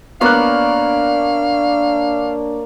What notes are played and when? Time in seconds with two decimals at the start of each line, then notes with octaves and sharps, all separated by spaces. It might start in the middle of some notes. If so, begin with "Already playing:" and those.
0.21 A#3 B3 D4 C#5 D5 F5 F#6